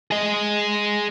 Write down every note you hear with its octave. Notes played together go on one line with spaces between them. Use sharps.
G#4 D#5